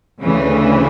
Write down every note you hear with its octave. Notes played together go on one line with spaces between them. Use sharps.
D2 C#3 E3